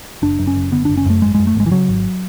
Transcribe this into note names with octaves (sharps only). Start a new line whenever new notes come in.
F#1 D4
F#2
C#4
F#1
D3 B3
F#1 D4
C#4
F#2 A3
G#1 G#3
F#2 G#3
A3
G#1 G#3
E3
C#3 F#3
G#1